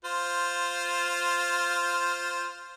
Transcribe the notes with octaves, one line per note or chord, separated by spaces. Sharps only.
F4 C5